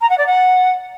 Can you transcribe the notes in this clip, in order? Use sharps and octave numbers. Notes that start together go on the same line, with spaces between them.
A#5
F#5
D5
F#5